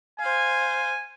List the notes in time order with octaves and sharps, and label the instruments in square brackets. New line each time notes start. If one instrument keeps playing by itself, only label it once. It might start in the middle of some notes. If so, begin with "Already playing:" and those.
[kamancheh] C5 F5 [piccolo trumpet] G#5